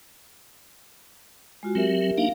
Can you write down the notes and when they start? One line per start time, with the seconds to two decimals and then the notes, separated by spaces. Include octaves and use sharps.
1.63 G#3 F4 F#4
1.75 F#3 C4 G4 A#4 E5
2.18 A#3 D4 D#4 F5